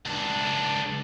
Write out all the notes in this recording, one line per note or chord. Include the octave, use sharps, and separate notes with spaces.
C#2 D4